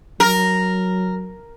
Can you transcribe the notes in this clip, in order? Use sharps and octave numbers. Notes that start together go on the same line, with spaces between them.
F#3 A#4